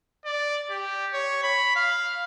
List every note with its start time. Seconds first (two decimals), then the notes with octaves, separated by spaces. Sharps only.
0.25 D5
0.70 G4
1.13 C#5
1.43 B5
1.75 F5